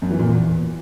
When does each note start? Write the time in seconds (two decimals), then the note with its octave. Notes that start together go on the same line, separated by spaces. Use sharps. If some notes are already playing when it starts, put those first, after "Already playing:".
0.02 F#2
0.11 E3
0.19 A#2
0.28 E2